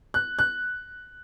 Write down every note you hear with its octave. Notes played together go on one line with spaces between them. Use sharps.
F#6
F#6